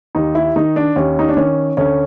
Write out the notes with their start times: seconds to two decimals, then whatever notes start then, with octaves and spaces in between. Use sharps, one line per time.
0.15 D#2 D#4
0.35 E4
0.56 D#3 D#4
0.76 D4
0.96 D#2 C#4
1.19 D#4
1.29 D4
1.37 D#3 C#4
1.77 D2 C#4